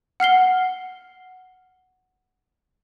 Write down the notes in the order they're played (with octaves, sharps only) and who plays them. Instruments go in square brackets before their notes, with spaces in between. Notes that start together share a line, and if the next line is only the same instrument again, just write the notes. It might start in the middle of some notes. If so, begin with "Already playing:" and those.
[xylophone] F#5 F6 C7 G7